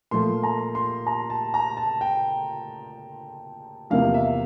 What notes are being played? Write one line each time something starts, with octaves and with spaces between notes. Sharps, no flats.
A#2 F3 A3 C6
A#5
C6
A#5
A5
A#5
A5
G5
E2 C3 F3 A#3 E4 F5
E5